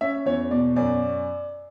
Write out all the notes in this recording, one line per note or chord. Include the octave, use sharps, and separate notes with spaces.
C#4 E5
E2 C#5
B2 D5
F#2 D5